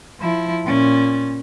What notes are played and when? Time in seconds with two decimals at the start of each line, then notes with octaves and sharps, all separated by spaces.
0.20 F3 E4
0.65 A#2 C#4